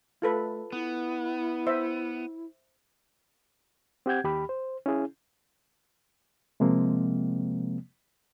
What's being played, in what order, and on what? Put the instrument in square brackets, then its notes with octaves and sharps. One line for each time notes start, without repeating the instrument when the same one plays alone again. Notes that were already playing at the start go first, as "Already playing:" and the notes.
[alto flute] A3 [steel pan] F4 A4 B4
[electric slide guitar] B3 [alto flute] E4
[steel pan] C5 E5
[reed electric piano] C4 G4 F#5 G6 G#6
D#2 G4 B5
C5
C#4 E4 G#4
C3 F3 G#3 A#3 C4